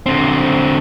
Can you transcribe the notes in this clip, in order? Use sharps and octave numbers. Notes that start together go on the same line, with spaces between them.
D3 C4